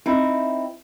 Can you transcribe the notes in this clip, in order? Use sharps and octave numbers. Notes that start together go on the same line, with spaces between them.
C4 D#4 E4